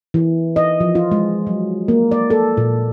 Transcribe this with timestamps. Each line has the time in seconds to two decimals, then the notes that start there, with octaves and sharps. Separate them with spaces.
0.14 E3
0.56 D#5
0.80 F3
0.95 F4
1.11 G#3
1.47 F#3
1.88 A#3
2.11 D5
2.30 A4
2.57 A#2